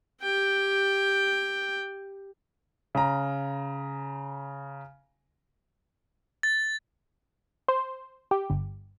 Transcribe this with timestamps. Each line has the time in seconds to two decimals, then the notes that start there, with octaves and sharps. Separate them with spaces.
0.23 G4 G5
2.95 C#3 A#5
6.43 A6
7.68 C5
8.31 G4
8.50 G1